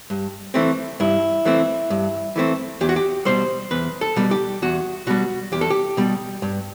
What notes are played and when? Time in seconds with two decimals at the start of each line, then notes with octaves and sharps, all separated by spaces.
0.10 G2
0.54 E3 A3 C4
1.00 G2 E4
1.45 E3 A3 C4
1.90 G2
2.36 E3 A3 C4
2.81 E2 G4
2.89 F#4
2.96 G4
3.25 B2 G3 C5
3.71 E2 B4
4.01 A4
4.16 B2 G3
4.31 G4
4.62 E2 F#4
5.07 B2 G3 F#4
5.52 E2 G4
5.61 A4
5.70 G4
5.97 B2 G3
6.42 G2